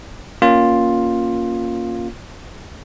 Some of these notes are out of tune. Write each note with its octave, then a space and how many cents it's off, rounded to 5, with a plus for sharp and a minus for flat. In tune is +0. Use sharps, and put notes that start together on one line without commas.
A#3 +5 C#4 +0 F4 +10